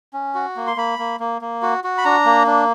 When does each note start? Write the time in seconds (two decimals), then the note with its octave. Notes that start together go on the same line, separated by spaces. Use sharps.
0.14 C#4
0.35 F#4
0.56 A#3
0.67 C6
0.77 A#3 B5
0.99 A#3
1.20 A#3
1.41 A#3
1.62 F#4
1.84 F#4
1.98 B5
2.05 D4 A#5
2.26 A#3
2.47 D4